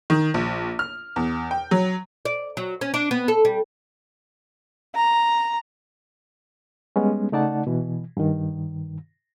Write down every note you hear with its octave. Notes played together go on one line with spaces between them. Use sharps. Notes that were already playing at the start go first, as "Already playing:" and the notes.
D#3
A#1
F6
E2
G5
F#3
D5
F#3
C#4
D4
B3
A4
G3
A#5
G3 G#3 B3 C#4
C#3 A3 D#4 D5 F#5 A5
B2 E3
G2 D#3